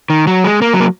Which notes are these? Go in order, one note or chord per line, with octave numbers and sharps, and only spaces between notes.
D#3
F#3
G#3
A#3
F#3
A#3